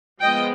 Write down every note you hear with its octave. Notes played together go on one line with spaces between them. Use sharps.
F3 G#3 B3 D#5 G5